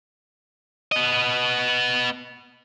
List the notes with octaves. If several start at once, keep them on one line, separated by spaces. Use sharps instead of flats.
B3 D#5